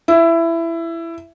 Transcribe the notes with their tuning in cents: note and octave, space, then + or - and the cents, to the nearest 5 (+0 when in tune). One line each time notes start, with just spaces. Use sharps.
E4 +15